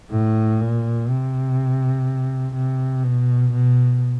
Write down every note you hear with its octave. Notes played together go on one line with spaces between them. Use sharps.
A2
A#2
C3
C3
B2
B2